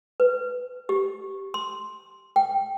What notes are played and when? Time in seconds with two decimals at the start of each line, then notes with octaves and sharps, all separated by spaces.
0.20 B4
0.89 G4
1.54 C6
2.36 G5